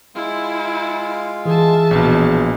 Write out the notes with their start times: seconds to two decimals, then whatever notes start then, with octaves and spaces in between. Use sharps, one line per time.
0.15 G#3 E4 F4 F5
1.45 E3 G#4 E5 A5
1.91 A#1 B2 C#4 F4